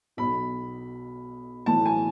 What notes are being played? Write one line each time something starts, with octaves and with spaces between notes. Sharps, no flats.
B1 B2 B5
B1 A2 E3 A5
G#5